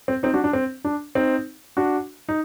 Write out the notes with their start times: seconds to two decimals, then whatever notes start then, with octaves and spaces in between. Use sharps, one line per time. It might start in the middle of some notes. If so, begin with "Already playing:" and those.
0.08 C4
0.23 C4 D#4
0.34 D4 F#4
0.44 D4
0.53 C4
0.85 D4
1.15 C4 D#4
1.77 D4 F#4
2.29 D#4